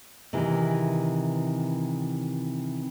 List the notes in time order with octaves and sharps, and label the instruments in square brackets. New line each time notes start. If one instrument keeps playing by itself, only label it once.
[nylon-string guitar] C3 D#3 E3 G#4